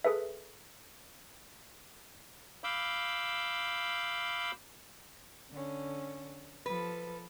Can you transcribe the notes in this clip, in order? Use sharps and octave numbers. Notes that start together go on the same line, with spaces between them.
G#4 A4 B4 E5
F5 B5 D6 E6 G6
D3 C#4
F3 A4 B4